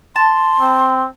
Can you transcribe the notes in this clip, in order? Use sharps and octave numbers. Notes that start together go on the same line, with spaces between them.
A5 C6
C4